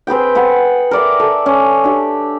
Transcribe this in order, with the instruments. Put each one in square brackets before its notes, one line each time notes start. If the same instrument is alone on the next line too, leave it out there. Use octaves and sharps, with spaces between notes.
[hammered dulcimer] C4 G#4 B4 G5
G#4 F#5 G#5 B5
A#4 D5 E5
A4
C#4
D4 G4